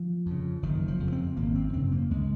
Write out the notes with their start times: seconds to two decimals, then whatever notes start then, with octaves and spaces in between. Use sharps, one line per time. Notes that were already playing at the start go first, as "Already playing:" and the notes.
Already playing: F3
0.26 F2 C#3
0.62 F#1 D#3
0.88 F3
1.00 F2 C#3
1.12 C4
1.36 G#1 A#3
1.55 C4
1.73 F#2 C#3 C4
1.92 A#3
2.10 C#2 G#3